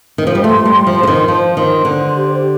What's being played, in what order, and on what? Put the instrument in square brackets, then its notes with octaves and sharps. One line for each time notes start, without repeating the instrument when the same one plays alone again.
[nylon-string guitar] D#3
F3
G3
[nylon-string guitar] A3 [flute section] C6
[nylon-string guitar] G3
[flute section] C6
[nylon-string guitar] F3
[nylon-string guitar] D3 [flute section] C5
[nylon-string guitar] D#3
[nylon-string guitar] F3 [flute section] C5
[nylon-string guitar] D#3 [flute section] C6
[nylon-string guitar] D3 [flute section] C5
[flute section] G4
G4